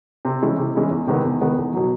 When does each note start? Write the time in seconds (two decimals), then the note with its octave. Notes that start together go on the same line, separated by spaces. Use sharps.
0.25 C3
0.42 E3 G#3 C#4 E4
0.58 C3
0.75 E3 G#3 C#4 E4
0.91 E2
1.07 C3 D#3 G#3 B3
1.25 E2
1.41 C3 D#3 G#3 B3
1.58 E2
1.74 B2 F#3